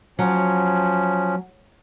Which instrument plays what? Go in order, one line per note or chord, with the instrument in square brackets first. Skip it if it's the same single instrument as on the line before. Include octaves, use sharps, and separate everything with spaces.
[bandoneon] F3 C#4 [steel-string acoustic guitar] F#3